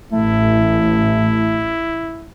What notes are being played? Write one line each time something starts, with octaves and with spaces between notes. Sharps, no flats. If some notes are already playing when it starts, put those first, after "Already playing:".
A1 A3 E4